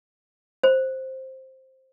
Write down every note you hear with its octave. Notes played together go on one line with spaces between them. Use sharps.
C5